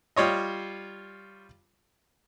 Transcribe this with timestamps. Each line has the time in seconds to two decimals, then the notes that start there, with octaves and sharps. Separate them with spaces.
0.16 G3 F4 C#5 D#5